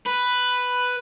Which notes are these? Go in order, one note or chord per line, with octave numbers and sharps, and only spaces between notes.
B4